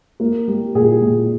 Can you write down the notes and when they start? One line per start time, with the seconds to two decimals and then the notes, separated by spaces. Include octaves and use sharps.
0.20 A#3
0.48 G3
0.75 A#2 G#4
1.01 A#2